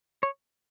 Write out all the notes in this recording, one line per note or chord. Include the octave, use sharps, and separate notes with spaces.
C#5